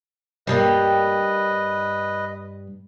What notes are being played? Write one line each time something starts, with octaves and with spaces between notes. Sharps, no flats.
G2 G3 A#3 B4 D#5